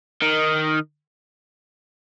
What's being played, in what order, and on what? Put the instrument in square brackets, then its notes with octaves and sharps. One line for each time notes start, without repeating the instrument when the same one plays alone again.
[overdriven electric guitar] D#3